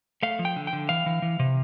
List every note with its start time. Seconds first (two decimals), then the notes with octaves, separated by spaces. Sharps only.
0.23 A3 F5
0.39 F3
0.45 G5
0.56 D3
0.67 G5
0.73 D3
0.89 E3 F5
1.06 E3
1.22 E3
1.39 C3